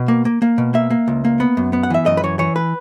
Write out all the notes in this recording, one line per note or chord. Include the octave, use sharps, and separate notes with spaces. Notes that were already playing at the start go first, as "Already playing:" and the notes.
Already playing: B2
A#3
A#3
A#3
B2
A#3 E5
A#3
C#2
A#3
B3
F#2
B3
F#5
E3 E5
F#2 D#5
B4
E3 C#5
E3 C#5
B4